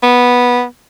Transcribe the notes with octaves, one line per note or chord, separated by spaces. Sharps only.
B3